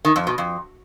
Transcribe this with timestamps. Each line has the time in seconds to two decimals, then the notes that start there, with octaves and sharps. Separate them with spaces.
0.05 D#3
0.16 F2
0.27 B2
0.38 F2